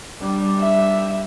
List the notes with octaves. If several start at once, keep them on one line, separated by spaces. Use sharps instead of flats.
G3 D4
E5